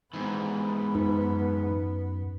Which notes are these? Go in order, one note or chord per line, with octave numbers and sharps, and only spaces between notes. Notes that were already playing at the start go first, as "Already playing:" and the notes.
G#2 E3 B3
F#2 D#4 B4